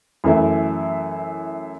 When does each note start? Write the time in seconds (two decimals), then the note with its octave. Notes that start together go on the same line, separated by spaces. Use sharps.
0.24 F#2 E3 A3 E4